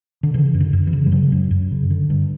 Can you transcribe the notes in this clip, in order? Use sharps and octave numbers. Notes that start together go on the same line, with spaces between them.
D3
C#3 E3
F#2
D3
F#2
E3
C#3
G3
C#3 F#3
F#2
F#2
C#3
D3
G2